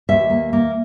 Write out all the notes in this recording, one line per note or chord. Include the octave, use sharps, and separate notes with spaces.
D#2 E5
A#3
A#3